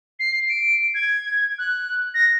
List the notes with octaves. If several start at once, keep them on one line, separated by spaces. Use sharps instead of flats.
C7
D7
G#6
F#6
A#6